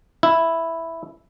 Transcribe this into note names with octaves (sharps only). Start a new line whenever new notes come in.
E4